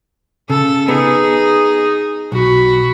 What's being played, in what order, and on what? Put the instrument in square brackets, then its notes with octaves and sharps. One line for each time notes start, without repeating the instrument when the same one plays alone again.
[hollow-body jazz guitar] C#3 [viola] A4
[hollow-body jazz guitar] B3 [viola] D#4 G#4
[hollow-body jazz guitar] B1 [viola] F#4 B5